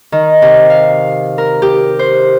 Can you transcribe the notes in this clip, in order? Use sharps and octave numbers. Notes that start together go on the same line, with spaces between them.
D#3
C3
F5
A#4
G4
C5